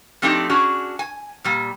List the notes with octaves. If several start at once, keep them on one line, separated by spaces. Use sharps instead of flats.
F3 A3 C4 D4 D#4 G4
C#4 D4 F#4 G#4
G#5
A#2 G3